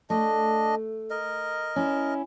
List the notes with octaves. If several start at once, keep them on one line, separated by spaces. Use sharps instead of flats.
A3 D4 D#5
A#4 D#5
C#4 E4